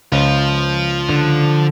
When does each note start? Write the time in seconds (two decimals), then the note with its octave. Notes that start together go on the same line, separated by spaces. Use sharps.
0.12 C#2 F3 F4
1.09 D3